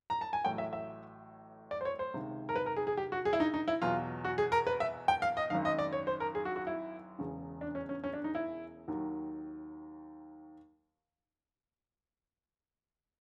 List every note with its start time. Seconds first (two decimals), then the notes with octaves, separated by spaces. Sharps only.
0.10 A#5
0.21 A5
0.33 G#5
0.45 A1 A2 F#3 G5
0.58 E5
0.73 E5
1.71 D5
1.81 C5
1.85 C#5
1.99 C5
2.14 C#2 C3 D#3
2.49 A#4
2.56 B4
2.66 A#4
2.76 G#4
2.87 G#4
2.97 G4
3.12 F#4
3.25 G#4
3.33 E4
3.40 D#4
3.54 D#4
3.68 E4
3.82 E2 B2 F#3 F4
4.25 F#4
4.38 G#4
4.52 A#4
4.67 B4
4.80 E5
5.08 G5
5.22 F5
5.37 D#5
5.50 G#1 F#2 D#3 F5
5.65 D#5
5.79 D5
5.93 C#5
6.07 C5
6.20 A#4
6.35 G#4
6.45 F#4
6.56 F#4
6.67 E4
7.19 E1 E2 C#3
7.61 D4
7.75 C#4
7.89 C#4
8.04 C#4
8.13 D4
8.24 D#4
8.35 E4
8.88 D#2 D#3 F#3